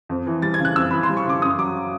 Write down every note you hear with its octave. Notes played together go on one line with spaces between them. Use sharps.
F2
E3
G3 A6
G#6
C#3
F#6
F2 E6
E3 B5
C6
G3
C#6
C#3 D6
F#2 D#6
F#3 D6